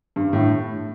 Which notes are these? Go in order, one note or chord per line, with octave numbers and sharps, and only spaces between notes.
G2
A2